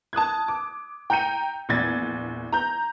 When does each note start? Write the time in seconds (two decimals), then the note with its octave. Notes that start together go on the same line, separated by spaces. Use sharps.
0.13 A5 D#6 F#6 G#6
0.48 D6
1.10 G5 A#5 G6 C#7 D#7
1.69 A#1 E2 G#6 A6
2.52 A#5 G6